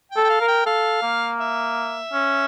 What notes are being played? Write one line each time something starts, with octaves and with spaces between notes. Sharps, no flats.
G5
A4
G5
F5
A#4
G5
A4 F5
A#3
E5
C#4